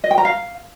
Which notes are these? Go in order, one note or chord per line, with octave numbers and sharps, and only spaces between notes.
D#5
G5
A#5
F5